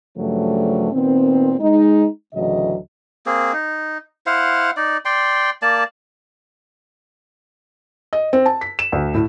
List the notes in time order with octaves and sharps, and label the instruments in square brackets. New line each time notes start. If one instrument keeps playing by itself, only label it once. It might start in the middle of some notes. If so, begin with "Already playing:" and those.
[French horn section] G2 C#3 F3 F#3 A3
A#2 D#3 B3 C4
G#3 D#4
D2 A2 C#3 E3 F#3 D#5
[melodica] A#3 C4 G#4
D#4
E4 C5 F5 F#5
D#4 D5
D5 G5 C6
A#3 D5 A5
[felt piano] D#5
C4
A5
B6
E7
D2
A2